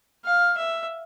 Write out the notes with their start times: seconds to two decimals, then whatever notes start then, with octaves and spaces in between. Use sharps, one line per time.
0.25 F5
0.57 E5